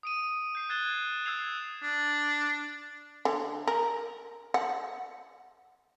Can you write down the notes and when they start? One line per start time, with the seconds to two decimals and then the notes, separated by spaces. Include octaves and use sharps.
0.03 D#6 D7 D#7
0.55 G6 C7
0.69 F#6 G#6 A6 E7 G7
1.26 E6 G#6 C7 F7
1.82 D4
3.25 D3
3.67 A#4
4.54 F#5